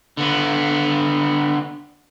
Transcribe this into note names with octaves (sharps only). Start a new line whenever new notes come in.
D3 B3